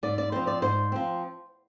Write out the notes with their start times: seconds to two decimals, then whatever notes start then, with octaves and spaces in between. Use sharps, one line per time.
0.03 G#2 D5
0.18 D5
0.32 F3 C4 C5
0.47 D5
0.62 G#2 C5
0.92 F3 C4